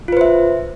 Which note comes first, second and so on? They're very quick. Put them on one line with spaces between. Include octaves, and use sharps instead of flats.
F4 B4 C5 E5